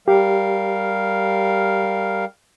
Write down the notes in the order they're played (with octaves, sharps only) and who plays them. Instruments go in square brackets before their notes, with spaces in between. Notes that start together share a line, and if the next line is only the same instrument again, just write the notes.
[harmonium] G3 A#4 F5 [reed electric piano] G4